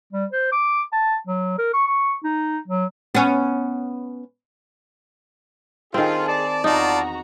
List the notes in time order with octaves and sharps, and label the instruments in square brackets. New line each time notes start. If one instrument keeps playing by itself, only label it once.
[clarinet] G3
C5
D6
A5
F#3
A#4
C#6
C#6
D#4
F#3
[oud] B3 C#4
[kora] D#3 C4 [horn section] F4 [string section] G#4 A4
[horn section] D5 A5
[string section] E2 F#4 A#5 [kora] D#4 [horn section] F4 D5 A5